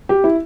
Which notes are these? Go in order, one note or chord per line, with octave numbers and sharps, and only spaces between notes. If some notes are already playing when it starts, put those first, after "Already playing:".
G4
E4